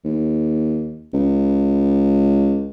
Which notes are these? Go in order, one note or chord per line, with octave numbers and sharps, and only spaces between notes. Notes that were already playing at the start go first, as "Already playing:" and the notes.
D#2
C#2